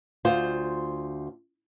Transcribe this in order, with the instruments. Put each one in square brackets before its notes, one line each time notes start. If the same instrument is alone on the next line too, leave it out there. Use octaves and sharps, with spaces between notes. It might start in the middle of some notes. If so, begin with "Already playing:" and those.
[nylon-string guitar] D2 F4 C5